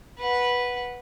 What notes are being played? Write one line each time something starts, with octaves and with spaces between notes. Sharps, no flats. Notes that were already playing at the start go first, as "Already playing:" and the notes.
B4 F#5